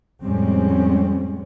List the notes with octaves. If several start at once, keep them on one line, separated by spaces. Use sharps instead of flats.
F2 A2 G3 G#3 C4 C#4